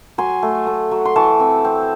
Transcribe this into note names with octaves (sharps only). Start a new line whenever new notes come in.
F#3 G#5 C6
A3
A3
F#3
C6
E3 A5 C#6
C4
C4